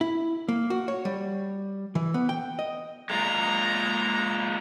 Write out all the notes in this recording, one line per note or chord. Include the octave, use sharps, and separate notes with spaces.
E4
A#3
F#4
C#5
G3
E3
B3
G5
D#5
G#3 A#3 F4 A#5